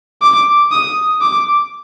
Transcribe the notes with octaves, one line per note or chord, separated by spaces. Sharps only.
D6
D#6
D6